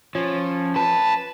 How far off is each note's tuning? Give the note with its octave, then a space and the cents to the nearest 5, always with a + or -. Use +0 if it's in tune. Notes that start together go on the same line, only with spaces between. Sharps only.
F3 +0 C#4 -15
B4 +0 A5 +0